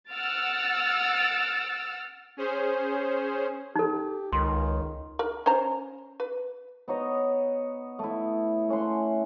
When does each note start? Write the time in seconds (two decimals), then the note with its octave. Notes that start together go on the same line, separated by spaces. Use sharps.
0.10 F#5 E6 F6 A6 D7
2.37 C#4 G#4 C5
3.76 D#4 G4 A4
4.33 C#2 D#3 C6
5.19 A#4
5.46 C#4 C5 A#5
6.20 B4
6.88 B3 D#4 C#5 D#5
7.99 A3 E4
8.68 A3 C#4 F#5 C6